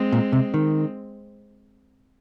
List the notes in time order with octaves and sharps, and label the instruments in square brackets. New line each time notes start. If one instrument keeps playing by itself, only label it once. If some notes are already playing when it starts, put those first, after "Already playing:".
Already playing: [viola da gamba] G#3 C4
[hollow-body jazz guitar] A#2
C3
D#3